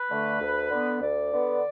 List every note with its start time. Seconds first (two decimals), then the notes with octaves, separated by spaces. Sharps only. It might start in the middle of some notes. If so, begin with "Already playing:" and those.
Already playing: B4
0.10 D3 A3
0.41 D2
0.70 D3 B3
1.01 D2 D5
1.32 D3 B3